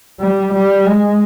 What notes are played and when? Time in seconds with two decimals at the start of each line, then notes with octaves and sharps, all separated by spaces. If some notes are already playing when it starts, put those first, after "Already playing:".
0.20 G3
0.53 G3
0.86 G#3